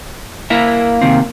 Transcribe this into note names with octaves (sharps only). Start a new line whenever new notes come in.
A#3 E4 A#4 E5
C3 D#3 C4